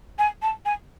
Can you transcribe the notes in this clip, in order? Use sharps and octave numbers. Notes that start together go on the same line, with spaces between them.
G#5
A5
G#5